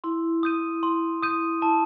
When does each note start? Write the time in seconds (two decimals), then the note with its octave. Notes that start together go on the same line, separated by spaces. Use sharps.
0.04 E4 C6
0.43 D#6 G6 D#7
0.83 C6
1.22 D#6 G6 D#7
1.62 E4 A5